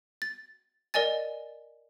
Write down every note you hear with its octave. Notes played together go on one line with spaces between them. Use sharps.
A6
A#4 D5 D#5 G#5 A6